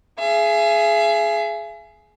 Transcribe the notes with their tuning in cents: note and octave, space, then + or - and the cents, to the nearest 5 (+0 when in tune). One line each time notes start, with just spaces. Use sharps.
G#4 +20 E5 +45